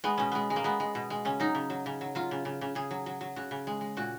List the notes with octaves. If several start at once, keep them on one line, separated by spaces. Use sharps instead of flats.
G#3 B3
B2 C#4
G#3 B3
G#3
A#3
G#3 B3
G#3
B2
G#3
C#3 C#4
F#3 D#4
C#3
F#3
C#3
F#3
F#3 F4
C#3
C#3
C#3
C#3 G#4
F#3
F#3
F#3
C#3 F#4
C#3
G#3
G#3
A#2 F#4